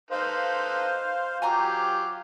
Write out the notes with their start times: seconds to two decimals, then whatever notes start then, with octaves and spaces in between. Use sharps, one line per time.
0.11 D#4 A4 B4 C5 F5
1.42 F#3 F4 G4 G#5 A#5 C6